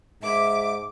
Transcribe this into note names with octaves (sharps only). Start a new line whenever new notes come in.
G#2 E5 D6